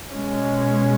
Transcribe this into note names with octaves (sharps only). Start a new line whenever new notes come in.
B2 G#3 C#4